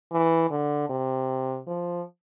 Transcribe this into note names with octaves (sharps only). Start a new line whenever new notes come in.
E3
D3
C3
F3